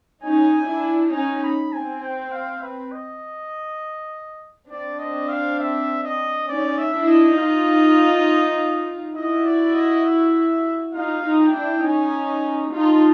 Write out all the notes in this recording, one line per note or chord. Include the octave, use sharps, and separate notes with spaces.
C#4 D#4 G#5
D4 E4
C#4 D#4 G#5
B5
C4 G#5
G5
F5
B4
D#5
C4 D4 D5
D#5
F5
E5
D#5
C#4 D#4 D5
E5
D4 E4
D#5
D#4 F4
E4 F#4 D#5
D5
D#5
E5
D#4 F4 F5
D#4 F4
G5
D4 E4
C#4 D#4 G#5
D#4 F4 A5